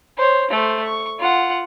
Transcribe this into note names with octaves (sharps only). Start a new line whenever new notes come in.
C5 C#5
A3 C5
C#6
F4 F#5